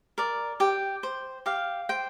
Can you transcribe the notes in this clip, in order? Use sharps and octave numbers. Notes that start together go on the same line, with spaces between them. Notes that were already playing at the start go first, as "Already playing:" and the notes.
A#4 D5
G4 G5
C5
G4 F5
C5 G5